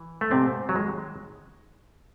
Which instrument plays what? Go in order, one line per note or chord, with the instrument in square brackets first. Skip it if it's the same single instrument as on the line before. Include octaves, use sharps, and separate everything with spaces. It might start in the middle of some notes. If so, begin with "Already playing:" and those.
Already playing: [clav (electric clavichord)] E3
A3
G#2 C3 C4
F#3
D#3 G#3